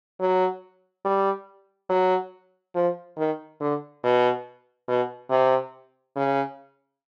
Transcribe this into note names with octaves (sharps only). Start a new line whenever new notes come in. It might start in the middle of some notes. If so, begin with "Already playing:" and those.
F#3
G3
F#3
F3
D#3
D3
B2
B2
C3
C#3